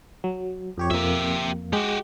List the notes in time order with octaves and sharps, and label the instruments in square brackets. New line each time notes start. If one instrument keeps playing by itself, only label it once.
[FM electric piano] F#3
F2 G4 C#5
[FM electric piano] F2 A#3 [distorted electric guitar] G4 E5
[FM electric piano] G#3 [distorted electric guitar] F#4 G4